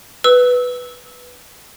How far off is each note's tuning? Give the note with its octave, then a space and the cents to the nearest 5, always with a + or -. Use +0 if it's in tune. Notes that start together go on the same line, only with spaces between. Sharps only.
B4 +0 E6 -20